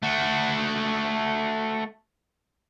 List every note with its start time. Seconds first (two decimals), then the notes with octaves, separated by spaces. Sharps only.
0.03 A3 F#4